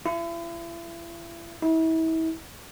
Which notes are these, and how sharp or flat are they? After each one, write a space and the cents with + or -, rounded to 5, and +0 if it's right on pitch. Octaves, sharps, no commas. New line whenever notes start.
E4 +40
E4 -35